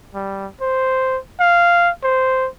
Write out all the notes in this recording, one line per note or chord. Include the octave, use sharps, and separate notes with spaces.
G3
C5
F5
C5